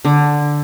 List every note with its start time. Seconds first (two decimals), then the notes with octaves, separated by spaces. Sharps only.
0.05 D3